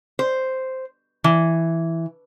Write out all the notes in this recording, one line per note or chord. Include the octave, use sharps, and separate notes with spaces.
C5
E3